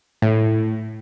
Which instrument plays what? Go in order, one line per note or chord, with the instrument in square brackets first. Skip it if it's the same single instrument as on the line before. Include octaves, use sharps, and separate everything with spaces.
[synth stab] A2